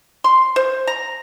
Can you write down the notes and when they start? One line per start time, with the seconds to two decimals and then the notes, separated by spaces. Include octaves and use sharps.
0.24 C6
0.56 C5
0.87 A#5